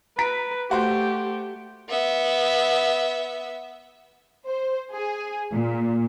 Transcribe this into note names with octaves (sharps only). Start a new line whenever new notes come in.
B4 A#5 B6 D7
A3 F#4 G4 C5
B3 E5
C5
G#4
A#2